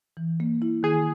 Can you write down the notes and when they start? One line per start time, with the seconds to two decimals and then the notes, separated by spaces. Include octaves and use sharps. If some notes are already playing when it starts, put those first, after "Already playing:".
0.17 E3
0.40 A#3
0.62 E4
0.83 D#3 G#4